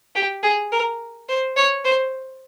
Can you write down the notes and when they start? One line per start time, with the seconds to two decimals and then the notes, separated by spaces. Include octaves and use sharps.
0.15 G4
0.43 G#4
0.72 A#4
1.29 C5
1.56 C#5
1.84 C5